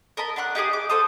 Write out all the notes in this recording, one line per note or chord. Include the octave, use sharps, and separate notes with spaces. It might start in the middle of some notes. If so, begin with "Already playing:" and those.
A#4 D#5 A5 B5
D4 F#5 B5 F#6
D#4 G4 G#4 D#6
D6
G#4 A4 C5 D#6